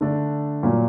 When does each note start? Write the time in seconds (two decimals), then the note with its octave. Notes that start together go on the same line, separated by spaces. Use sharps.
0.01 D3 A3 D4
0.63 A#2 F#3 A#3